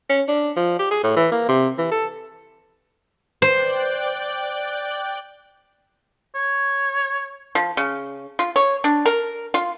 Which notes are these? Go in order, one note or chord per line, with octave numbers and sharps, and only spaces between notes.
C#4
D4
F3
G4
G#4
A2
E3
A#3
C3
E3
A4
C5 D5 G5 F#6
C#5
F3
C#3
F4
C#5
D4
A#4
F4